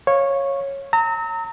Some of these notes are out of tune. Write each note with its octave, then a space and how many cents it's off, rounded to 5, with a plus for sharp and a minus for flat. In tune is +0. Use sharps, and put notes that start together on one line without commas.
C#5 -10 F5 +0
A#5 -30 E6 -40